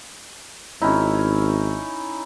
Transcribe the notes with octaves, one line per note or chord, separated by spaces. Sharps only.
G#1 C#4 D#4 E4